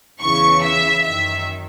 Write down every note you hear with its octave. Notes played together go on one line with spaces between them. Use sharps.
E2 C#3 E3 C#6
E5
F#2 D#3 E5